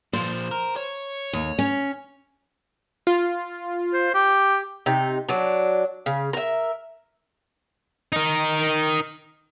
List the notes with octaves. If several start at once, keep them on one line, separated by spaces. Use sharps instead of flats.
A#2 F3 C5
A#4
C#5
D#2
C#4
F4
C5
G4
C3 D#4
F#3 D4
C#3
A#4 E5
D#4 A#4